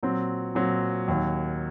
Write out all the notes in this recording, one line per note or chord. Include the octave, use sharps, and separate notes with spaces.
A#2 F#3 C4
A#2 F#3 C4
D#2 D#3 F#3